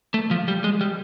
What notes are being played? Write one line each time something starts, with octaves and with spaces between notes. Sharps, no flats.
A3
F3
G3
G#3
G3